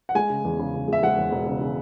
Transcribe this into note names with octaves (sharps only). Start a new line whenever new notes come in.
F#5
G#3 G#5
C#3
E2
C#3
C#3
G#3 E5
G#3 F#5
E2
E1
C#3
C#3